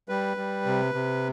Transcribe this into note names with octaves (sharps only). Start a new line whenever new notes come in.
G3 B4
G3
C3
C3